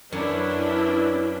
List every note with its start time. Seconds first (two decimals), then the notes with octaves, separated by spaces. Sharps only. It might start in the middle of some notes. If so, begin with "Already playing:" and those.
0.12 F#2 C#4 D4 E4 B4 C#5 D5